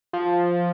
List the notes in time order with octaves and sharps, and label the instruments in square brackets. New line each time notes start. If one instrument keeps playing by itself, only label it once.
[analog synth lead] F3